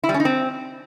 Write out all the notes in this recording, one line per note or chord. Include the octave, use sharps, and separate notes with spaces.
E4
G3
C#4
D#4
C4